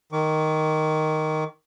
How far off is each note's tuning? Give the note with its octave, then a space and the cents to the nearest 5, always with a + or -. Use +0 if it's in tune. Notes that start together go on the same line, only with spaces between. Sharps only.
D#3 +0 D6 -45